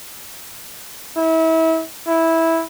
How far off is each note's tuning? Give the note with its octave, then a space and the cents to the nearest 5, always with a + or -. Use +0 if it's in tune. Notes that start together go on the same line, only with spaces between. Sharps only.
E4 -30
E4 -10